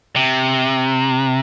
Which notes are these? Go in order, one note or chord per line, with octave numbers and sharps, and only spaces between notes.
C3